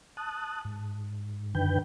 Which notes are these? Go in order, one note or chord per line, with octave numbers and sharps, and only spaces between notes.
A5 D#6 F#6
G#2
F#2 D3 D#3 B4 G5 G6